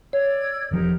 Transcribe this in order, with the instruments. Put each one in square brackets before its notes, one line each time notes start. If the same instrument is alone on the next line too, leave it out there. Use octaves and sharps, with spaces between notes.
[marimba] C#5 [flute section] D5 E6 G#6
[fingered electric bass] E1 F3 [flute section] D#4 G4 A#4